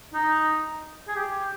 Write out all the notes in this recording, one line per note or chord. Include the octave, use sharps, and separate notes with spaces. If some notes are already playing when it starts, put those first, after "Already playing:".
D#4
G#4
G4